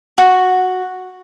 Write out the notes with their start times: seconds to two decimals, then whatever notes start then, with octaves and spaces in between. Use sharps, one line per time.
0.18 F#4